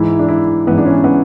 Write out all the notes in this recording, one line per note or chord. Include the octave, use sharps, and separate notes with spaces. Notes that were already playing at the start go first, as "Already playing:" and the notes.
Already playing: G#2 E3 E4
D4
E4
G#2 E3 B3
D4
C#4
B3